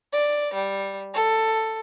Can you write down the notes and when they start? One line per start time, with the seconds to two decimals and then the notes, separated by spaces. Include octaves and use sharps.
0.13 D5
0.54 G3
1.14 A4